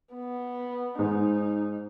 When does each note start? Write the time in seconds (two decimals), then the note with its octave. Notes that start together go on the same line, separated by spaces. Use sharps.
0.14 B3
0.99 G#2 D#4